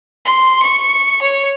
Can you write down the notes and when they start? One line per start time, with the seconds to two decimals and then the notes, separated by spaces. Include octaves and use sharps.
0.25 C6
0.62 C#6
1.22 C#5